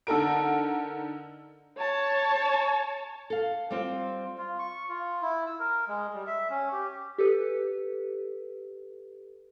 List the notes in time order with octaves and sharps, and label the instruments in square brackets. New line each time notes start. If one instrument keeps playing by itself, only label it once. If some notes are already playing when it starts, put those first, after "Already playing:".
[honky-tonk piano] D3 D#4 A4 A#4 D7
[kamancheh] C#5 A5
[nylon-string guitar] A4 F5
G3 C4 F4
[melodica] F4
C#6
F4
E4
E6
A#4
G#3
G3
E5
C#4
G4
[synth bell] G4 A4 B4